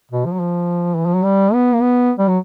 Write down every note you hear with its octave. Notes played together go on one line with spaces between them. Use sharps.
B2
F3
F#3
F3
E3
F3
F#3
G3
B3
A#3
B3
G3
F#3